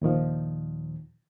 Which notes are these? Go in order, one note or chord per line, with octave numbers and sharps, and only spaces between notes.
D#2 A#2 D#3 F3